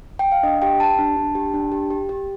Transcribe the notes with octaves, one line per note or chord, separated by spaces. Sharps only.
G5
F5
D4 D#5
G4 G5
G4 A5
D4
D4
G4
D4
G4
G4
G4